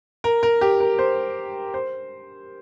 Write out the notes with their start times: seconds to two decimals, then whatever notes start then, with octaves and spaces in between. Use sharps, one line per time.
0.24 A#4
0.43 A#4
0.61 G4
0.80 A#4
0.99 C5
1.74 C5